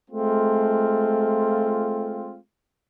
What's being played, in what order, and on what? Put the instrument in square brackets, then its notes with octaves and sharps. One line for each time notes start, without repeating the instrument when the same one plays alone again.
[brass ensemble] G#3 A3 C4 F4